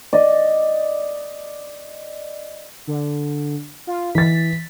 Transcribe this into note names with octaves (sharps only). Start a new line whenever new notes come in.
D5 D#5
D3
F4
E3 A6 B6